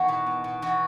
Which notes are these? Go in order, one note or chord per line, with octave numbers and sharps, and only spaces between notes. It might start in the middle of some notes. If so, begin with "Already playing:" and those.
Already playing: E2 D#3 E4 F#4
B2
B2
B2
E3 F#4